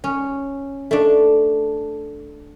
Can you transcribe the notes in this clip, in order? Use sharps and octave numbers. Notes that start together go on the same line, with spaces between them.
C#4
A3 D4